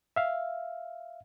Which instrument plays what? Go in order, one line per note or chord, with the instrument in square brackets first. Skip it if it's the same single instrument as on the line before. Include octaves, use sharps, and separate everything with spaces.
[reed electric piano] E5 F5